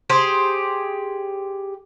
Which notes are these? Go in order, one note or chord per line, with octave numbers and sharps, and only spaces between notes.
G4 G#4 C5